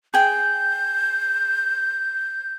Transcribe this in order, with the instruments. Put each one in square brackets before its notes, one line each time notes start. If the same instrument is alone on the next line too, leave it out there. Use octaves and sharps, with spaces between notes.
[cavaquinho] G#4 G5 [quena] G6